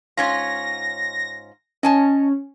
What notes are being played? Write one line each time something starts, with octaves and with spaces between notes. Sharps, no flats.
G#2 C#4 F4 A#6
C#4 D#5 G#5 A5